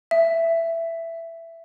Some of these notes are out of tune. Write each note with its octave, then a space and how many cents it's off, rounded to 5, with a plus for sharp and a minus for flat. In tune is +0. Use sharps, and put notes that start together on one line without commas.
E5 +10